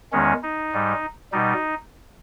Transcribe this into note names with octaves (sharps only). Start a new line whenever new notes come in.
E2 D#3 G#3 C#4
D#4
G#2 G3
B2 G3 D#4